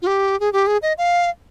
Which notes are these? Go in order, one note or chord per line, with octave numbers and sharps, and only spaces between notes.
F4
G4
G#4
G4
G#4
D#5
F5